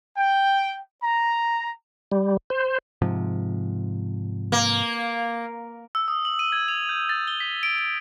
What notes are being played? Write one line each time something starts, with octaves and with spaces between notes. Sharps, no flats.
G5
A#5
G3
C5
G#2 C3 F3
A#3
E6
D#6
F#7
D#7
G#6
F7
G6
A6
G7
B6
D7
D7